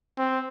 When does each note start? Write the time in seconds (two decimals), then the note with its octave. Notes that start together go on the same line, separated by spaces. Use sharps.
0.18 C4